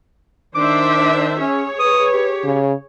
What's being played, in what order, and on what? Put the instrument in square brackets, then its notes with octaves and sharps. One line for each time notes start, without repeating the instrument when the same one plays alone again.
[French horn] D#3 [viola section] D4 C5 E5 [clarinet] D6
[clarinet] C#4 [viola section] G#4 C#5
[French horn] B4 [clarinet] D#6
[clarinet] G4
[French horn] C#3